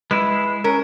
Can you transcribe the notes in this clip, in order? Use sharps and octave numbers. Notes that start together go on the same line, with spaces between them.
G#3 E4 B4
C#4 A#4